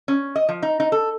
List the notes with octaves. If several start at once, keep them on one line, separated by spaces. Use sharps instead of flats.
C#4
D#5
F3
D#4
D#4
A4